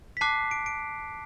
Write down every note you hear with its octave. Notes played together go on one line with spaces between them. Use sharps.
B6
A5 D6 F#6 C7
D7
D7